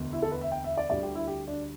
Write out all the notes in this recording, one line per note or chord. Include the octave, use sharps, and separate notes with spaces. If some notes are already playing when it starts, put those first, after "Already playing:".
Already playing: E1 D2 D3 B3
E4
A4
B4
E5
G5
E5
D5
D2 D3 G3 D5
G4
E4
G4
D4